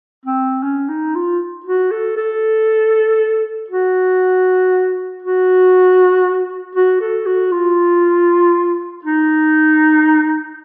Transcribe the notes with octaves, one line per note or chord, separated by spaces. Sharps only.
C4
C#4
D#4
F4
F#4
A4
A4
F#4
F#4
F#4
A4
F#4
F4
D#4